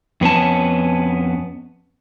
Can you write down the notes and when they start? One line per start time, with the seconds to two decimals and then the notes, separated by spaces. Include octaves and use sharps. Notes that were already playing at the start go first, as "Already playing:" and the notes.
0.21 F2 B3 C#4 A5